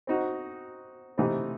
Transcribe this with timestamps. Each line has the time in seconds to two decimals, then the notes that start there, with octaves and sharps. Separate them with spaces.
0.07 C4 D#4 F#4
1.18 C3 E3 A3 C4 D#4